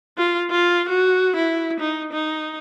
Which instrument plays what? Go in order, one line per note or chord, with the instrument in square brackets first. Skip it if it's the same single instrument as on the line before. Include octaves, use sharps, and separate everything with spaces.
[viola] F4
F4
F#4
E4
D#4
D#4